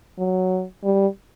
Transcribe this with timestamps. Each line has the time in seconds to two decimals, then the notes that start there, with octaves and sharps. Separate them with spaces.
0.19 F#3
0.84 G3